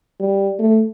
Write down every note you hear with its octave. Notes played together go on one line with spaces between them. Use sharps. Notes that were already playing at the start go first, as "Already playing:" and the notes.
G3
A3